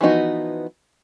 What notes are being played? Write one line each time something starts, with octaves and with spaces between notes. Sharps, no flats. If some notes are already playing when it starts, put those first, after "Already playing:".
E3 F3 B3 D#4 F#4